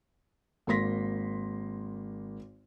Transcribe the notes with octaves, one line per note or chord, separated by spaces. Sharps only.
G#1 A#3 C6 A#6 B6